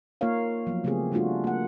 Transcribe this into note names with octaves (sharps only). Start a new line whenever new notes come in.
A#3 D#4 F4 A#4 C#5 F5
F3 F#3 B3
C#3 A3 B3 C4 G4 G#4
G3 A3 D4 F4 F#4
A#3 F#5